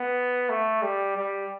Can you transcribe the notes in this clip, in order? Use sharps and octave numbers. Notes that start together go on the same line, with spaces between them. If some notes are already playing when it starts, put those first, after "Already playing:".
Already playing: B3
A3
G3
G3